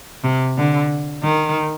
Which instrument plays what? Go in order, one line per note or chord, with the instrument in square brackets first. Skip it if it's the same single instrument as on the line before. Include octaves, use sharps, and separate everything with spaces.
[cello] C3
D3
D#3